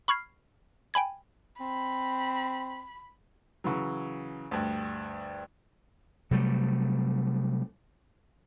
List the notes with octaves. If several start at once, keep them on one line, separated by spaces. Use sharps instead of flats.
B5 C#6 F6 G#6 C7
G5 G#5 B5 G#6
C4 B5
C#3 E3 F#3
D2 G2
C3 F#3 G3 A3